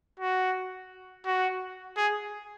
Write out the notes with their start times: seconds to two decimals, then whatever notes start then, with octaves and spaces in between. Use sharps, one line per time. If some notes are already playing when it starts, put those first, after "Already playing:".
0.20 F#4
1.26 F#4
1.97 G#4